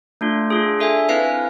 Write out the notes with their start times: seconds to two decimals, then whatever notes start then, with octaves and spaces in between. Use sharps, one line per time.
0.21 A3 D4 F4
0.50 D4 F4 G#4
0.79 D4 A4 E5 G#5
1.09 C4 E4 B4 F5 G#5